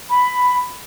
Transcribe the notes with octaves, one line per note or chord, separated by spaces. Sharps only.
B5